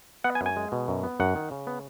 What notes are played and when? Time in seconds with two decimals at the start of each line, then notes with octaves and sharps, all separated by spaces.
0.24 B3 F#5
0.35 G#5
0.41 F#2
0.46 G#5
0.57 G#3
0.72 B2
0.88 F#2
1.03 B3
1.20 F#2 F#5
1.35 D#3
1.51 C#3
1.67 B3